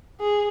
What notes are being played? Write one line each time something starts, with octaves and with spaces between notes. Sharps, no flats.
G#4